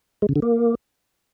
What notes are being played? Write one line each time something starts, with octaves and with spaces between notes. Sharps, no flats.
G#3
C#3
D3
A#3